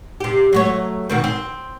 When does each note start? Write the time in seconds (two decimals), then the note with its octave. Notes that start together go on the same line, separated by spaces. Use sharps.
0.20 C3 G4
0.53 F#3 A3 C#5
1.09 B2 D#3 C4
1.24 C4